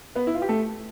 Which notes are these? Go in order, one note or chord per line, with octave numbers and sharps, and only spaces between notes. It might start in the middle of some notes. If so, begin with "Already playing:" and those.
B3 B4
E4
F4
G4
A3 A4